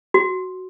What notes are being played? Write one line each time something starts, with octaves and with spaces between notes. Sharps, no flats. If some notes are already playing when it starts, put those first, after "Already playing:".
F#4